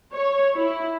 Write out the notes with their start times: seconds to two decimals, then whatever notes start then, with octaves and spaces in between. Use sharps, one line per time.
0.14 C#5
0.57 E4